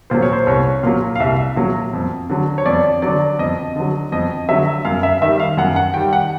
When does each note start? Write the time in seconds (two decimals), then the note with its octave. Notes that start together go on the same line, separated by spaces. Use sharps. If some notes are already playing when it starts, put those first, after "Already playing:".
0.10 A#2 F#3 C5
0.22 C#5
0.33 C5
0.46 C2 C#5
0.83 A#2 F#3 F5
1.15 F5
1.20 C2 E5
1.56 A#2 F#3
1.93 F2
2.29 D3 F#3
2.58 C#5
2.66 F2 D5
3.02 D3 F#3 D5
3.39 F2 D#5
3.76 D3 F#3
4.12 F2 D#5
4.49 D3 F#3 E5
4.85 F#2 F5
5.03 E5
5.22 D#3 G3 E5
5.40 F5
5.57 F#2 F#5
5.76 F#5
5.94 D#3 G3 G5
6.13 F#5